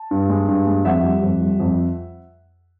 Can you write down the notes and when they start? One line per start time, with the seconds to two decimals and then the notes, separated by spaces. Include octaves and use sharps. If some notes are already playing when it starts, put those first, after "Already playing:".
Already playing: A5
0.11 G2
0.30 G#3
0.48 G2
0.67 G#3
0.85 F2 E5 F#5
1.04 G3
1.23 F2
1.41 G3
1.60 F2